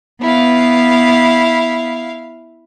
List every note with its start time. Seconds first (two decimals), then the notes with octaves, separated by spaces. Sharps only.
0.21 B3 E4 F5